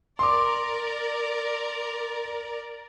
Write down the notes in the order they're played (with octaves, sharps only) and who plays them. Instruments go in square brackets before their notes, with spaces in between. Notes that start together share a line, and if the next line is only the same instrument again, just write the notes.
[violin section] A#4 D5 [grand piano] C6 D6